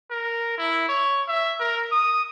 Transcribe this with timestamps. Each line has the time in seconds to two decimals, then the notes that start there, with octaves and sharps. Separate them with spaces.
0.10 A#4
0.58 E4
0.89 C#5
1.28 E5
1.60 A#4
1.92 D#6